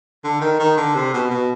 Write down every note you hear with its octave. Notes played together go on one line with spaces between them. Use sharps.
D3
D#3
D#3
D3
C3
B2
B2